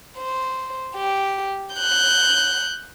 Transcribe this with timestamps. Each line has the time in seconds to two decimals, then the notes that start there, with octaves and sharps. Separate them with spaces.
0.18 C5
0.96 G4
1.75 F#6 G6